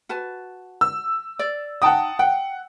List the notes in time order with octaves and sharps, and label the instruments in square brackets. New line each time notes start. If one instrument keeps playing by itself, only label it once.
[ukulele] F#4 B4 A5
[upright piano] E6
[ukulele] D5
[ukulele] D#4 G5 [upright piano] F#5 A5 D#6
[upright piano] F#5 [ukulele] G5